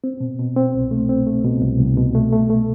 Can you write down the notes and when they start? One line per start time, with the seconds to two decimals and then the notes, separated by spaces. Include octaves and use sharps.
0.04 C4
0.21 B2
0.39 B2
0.56 C4
0.74 C2
0.91 A3
1.09 C4
1.27 A3
1.45 B2
1.62 C2
1.79 C2
1.97 B2
2.15 A3
2.32 A3
2.50 A3